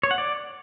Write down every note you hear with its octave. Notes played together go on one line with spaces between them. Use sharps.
C#5
F#5
D5